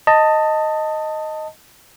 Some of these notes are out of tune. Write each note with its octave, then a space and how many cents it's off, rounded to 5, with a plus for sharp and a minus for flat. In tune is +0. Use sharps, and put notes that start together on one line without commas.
D#5 +0 A5 +20